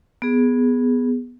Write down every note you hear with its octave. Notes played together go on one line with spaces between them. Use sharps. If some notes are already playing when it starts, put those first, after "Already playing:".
B3 G#4